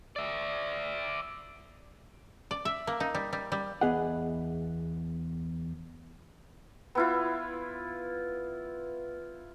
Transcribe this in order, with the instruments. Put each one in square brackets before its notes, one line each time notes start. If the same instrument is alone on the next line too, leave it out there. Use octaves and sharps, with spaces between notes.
[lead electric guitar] D5 E5
[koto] D5
E5
A#3
D#4
G3
G3
G3
[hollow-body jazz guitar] E2 G#3 B3 G#4 D#5 F#5
[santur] B3 E4 F4